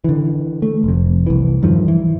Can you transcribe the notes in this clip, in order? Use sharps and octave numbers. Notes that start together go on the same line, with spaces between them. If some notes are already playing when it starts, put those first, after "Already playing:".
D3 E3
A3
F1 F2
C2 E3
E2 G2 D#3 F3
E3